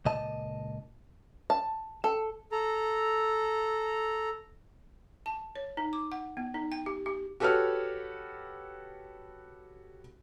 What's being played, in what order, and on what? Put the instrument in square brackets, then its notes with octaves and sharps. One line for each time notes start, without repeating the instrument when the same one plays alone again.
[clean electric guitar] C#2 A#2 D#5 A5
[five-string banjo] A5
A4
[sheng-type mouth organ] A4 A#5
[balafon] A5
C#5
D#4
D6
F#5
B3
D#4
G5
G4
G4
[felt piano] F#4 G4 A4 B4 C#5 F6